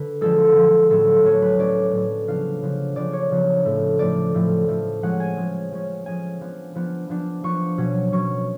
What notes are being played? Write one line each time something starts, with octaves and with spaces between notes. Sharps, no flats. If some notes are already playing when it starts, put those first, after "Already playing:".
Already playing: D3 B4
D3 F3 G#3 A4
D3 F3 G#3
A2 F#3 A3 C#4 A4
A2 F#3 A3 C#4 C#5
B4
A2 F#3 A3 C#4 D5
A2 F#3 A3 C#4
C#3 F3 B3 D4 F5
C#3 F3 B3 D4
C#3 F3 B3 D4 D5
C#5
C#3 F3 B3 D4
A2 F3 A3
A2 F3 A3 D5
A2 F3 A3
A2 F3 A3
F3 G#3 C#4 F#5
G#5
F3 G#3 C#4
F3 G#3 C#4
F3 G#3 C#4 G#5
F3 B3 D4
F3 B3 D4
F3 B3 D4
F3 B3 D4 C#6
B2 F#3 C#4
B2 F#3 C#4 C#6